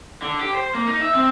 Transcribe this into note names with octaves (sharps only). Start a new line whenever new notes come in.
D3
G4
C5
A#3
D#4
E5
C4